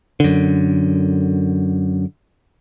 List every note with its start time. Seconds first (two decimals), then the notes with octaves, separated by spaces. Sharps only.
0.20 F#2 D3